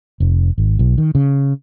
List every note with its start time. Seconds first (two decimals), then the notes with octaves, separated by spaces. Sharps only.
0.20 F1
0.58 G#1
0.79 B1
0.98 D#3
1.15 C#3